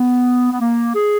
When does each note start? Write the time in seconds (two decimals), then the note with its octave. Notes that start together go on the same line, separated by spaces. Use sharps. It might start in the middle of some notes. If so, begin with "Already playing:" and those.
Already playing: B3
0.51 B3
0.59 A#3
0.94 G#4